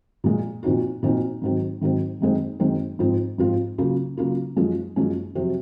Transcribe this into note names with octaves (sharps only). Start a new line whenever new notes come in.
A#2 F3 G#3
A#2 F3 C4 D#4 F#4
A#2 F3 C4 D#4 F#4
G#2 D#3 F#3 C4
G#2 D#3 F#3 C4
F#2 D#3 G#3 C4
F#2 D#3 G#3 C4
G#2 F3 C4 F4
G#2 F3 C4 F4
C#3 F#3 A#3 F4
C#3 F#3 A#3 F4
F#2 F3 G#3 C#4
F#2 F3 G#3 C#4
F2 C3 F#3 C4 F#4